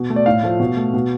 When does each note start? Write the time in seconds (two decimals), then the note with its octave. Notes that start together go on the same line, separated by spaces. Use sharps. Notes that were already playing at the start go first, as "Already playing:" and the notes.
Already playing: B2
0.10 A3
0.16 D5
0.26 A2 F5
0.43 F3 A3
0.60 B2
0.77 A3
0.94 B2